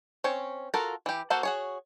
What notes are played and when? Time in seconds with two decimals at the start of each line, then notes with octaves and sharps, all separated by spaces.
0.24 C4 C#4 C#5
0.74 F4 F#4 A4 A#4
1.06 E3 G4
1.30 A#3 F#4 A4 C5 F#5
1.43 F#4 G#4 C#5